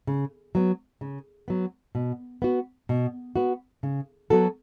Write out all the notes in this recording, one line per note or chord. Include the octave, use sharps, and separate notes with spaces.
C#3
F#3 B3
C#3
F#3 B3
B2
B3 F#4
B2
B3 F#4
C#3
F#3 B3 F#4 A4